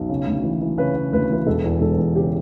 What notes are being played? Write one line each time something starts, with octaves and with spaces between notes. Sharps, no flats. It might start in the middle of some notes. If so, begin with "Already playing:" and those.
Already playing: B1
C#3
D2
E3
E3
C#3 B4
C#3
D2 B4
E3 B4
E1 A4
E2
E1 A4
E2
C#3 G4